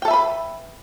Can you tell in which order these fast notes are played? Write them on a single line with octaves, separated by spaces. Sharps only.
G5 A4 E5 B4 B5